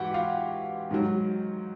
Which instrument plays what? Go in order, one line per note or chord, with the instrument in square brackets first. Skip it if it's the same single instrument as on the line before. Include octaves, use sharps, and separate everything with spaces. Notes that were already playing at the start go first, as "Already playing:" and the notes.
Already playing: [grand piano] G#2 E3 F#4 G4 F#5 G5
F4 F5
G#2 D#3 F#3